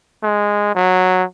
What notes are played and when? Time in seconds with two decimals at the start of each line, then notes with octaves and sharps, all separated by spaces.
0.23 G#3
0.75 F#3